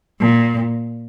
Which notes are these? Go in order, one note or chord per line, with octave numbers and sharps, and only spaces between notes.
A#2